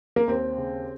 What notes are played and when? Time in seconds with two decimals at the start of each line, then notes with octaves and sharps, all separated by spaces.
0.16 A#3
0.28 D#2 C4
0.58 C#3